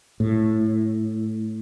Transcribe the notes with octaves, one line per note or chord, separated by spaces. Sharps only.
A2